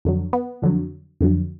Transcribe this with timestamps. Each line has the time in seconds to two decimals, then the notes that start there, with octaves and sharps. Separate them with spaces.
0.05 F2 D3 F#3
0.33 B3
0.62 F2 D3 F#3
1.21 F2 D3 F#3